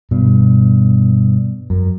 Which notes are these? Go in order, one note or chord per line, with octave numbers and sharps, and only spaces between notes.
G2 B2
F#2